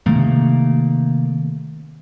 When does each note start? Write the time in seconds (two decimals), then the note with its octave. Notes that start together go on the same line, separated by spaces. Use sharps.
0.06 C3 D#3 A3 A#3